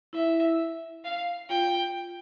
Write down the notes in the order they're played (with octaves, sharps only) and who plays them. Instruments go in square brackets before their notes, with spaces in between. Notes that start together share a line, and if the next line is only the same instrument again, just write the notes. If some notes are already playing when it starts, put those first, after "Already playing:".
[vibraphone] E4 [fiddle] E5
[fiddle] F5
[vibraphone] F4 [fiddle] G5